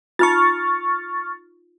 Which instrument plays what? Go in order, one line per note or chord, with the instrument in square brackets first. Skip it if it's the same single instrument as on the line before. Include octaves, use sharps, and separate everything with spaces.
[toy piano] D#4 F4 [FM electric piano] C#6 F6 A6